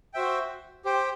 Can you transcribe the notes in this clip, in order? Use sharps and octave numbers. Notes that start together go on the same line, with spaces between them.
F#4 C5 E5 G5
G4 C5 G5